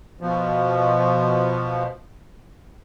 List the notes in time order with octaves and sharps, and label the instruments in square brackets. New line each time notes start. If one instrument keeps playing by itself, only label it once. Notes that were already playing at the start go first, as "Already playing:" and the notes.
[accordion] B2 F3